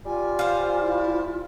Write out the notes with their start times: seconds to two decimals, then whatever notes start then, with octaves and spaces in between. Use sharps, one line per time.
0.05 G3 F4 G#5
0.39 C5 F5
0.80 E4